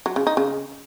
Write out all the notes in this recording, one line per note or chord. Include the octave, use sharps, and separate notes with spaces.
F#3
C#3
D#4
C#3